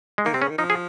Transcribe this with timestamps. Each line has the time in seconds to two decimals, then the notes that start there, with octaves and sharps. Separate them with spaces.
0.18 G#3
0.25 D#3 A#3
0.33 C3 C4
0.42 C#3 C#4
0.50 D#3
0.58 F3 D#4
0.70 G#4